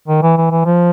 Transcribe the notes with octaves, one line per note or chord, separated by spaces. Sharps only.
D#3
E3
E3
E3
F3